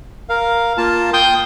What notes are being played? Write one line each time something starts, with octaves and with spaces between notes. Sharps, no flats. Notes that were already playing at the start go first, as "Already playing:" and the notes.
A#4 F5
A#3 F4 A5
G5 C6 D#6 G6